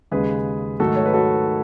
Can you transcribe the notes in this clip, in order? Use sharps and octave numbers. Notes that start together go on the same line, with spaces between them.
D#2 C#3 G#3 G#4 B4
G#2 D#3 F#3 A3 F#4 A4
C#5
B4
F#4 A4